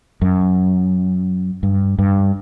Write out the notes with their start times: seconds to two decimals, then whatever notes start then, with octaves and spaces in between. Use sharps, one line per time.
0.22 F#2
1.63 G2
1.99 G2